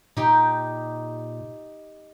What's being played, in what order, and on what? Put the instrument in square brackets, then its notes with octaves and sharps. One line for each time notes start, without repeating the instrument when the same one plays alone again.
[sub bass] A#2 [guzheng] D#4 G4 G5